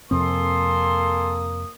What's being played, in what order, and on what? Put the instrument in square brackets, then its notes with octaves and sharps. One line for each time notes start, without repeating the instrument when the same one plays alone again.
[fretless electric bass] F2 C3 C4 [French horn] A#3 [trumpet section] A4 G#5 C6 [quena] D#6